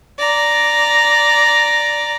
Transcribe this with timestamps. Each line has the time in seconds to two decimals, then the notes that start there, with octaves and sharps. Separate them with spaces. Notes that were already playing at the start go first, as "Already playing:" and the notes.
0.19 D5 A#5